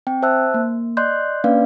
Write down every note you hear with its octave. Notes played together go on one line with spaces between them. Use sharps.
C4 G5
C5 E5 A5 E6 F#6
A#3
D5 D#5 C6 F#6 G6
A#3 C#4 D4 B4 D5 F5